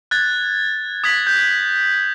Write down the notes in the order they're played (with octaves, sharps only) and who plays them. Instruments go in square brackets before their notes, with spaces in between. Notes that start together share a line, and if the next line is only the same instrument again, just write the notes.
[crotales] F#6 G#6 A6
D#6 G#6 B6 F#7
G6